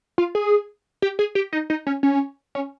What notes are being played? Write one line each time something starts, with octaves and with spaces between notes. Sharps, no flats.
F4
G#4
G4
G#4
G4
D#4
D#4
C#4
C#4
C#4